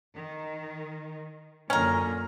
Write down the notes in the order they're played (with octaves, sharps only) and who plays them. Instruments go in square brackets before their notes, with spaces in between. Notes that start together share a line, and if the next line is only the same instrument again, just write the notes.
[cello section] D#3
[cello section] F#2 A#2 D3 [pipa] C#4 A#4